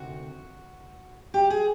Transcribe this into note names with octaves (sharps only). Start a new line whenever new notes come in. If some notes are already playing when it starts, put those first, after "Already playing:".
Already playing: D2 C3 D#3 F#4
G4
G#4